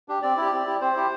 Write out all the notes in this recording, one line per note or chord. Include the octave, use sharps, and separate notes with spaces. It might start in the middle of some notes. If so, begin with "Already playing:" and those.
D4 G4
C4 D5
E4 G4
C4
E4 G4
C4 C5
E4 G4